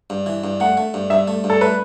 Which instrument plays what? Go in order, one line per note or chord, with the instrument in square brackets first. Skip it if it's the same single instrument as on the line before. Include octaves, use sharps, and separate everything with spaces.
[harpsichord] G2
E3
G2
[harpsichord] A3 [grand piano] F#5
[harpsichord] A3
G2
[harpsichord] G2 [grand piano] E5
[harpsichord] A3
G2
[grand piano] A4
[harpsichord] A3 [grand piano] B4